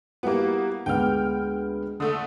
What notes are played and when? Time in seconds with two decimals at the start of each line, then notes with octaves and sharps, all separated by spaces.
0.23 G3 A#3 B3 E4 F#4
0.86 D2 G#3 B3 G5 F6
2.00 D3 A3 D#6